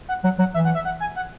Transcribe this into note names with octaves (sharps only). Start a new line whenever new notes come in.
F#5
F#3 F#5
F#3 F#5
E3 E5
F#5
E5
F#5
G#5
F#5